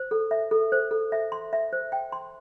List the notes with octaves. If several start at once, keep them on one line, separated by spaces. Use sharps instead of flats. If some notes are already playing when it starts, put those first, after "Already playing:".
Already playing: C5
A4
E5
A4
C5
A4
E5
C6
E5
C5
G5
C6